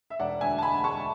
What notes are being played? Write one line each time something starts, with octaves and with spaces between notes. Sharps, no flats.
E5
E1 D5 F#5
D2 E5 G#5
A5
G#3 G#5 B5
G#3 A5 C#6